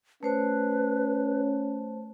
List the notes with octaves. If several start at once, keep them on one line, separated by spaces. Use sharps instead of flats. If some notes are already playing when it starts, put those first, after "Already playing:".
A3 C#4 B4 C5 A5